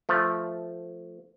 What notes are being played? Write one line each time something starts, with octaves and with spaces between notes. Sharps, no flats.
F3 A3